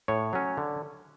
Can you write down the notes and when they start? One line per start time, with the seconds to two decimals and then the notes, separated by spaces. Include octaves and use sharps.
0.08 A2 C#5
0.33 F#3 C#4
0.57 D3